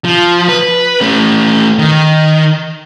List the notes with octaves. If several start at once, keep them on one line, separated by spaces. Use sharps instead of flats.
F3
B4
A3 C#4
D#3